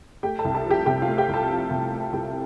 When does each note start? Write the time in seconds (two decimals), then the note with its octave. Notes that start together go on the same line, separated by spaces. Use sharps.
0.23 A3 G4 G5
0.39 A4 A5
0.45 C2
0.55 A4 A5
0.65 F3
0.71 G4 G5
0.86 C3 G4 G5
1.02 F4 F5
1.08 A3
1.18 G4 G5
1.29 C2 A4 A5
1.50 F3
1.71 C3
1.92 A3
2.13 C2 G4 G5